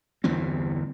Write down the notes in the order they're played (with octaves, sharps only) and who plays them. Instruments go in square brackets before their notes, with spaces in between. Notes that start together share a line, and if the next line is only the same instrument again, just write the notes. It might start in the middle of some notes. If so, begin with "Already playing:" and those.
[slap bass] G1 E2 E3 C4